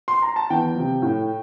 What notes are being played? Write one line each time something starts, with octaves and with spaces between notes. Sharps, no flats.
C6
A#5
A5
E2 G5
C3 F3
A2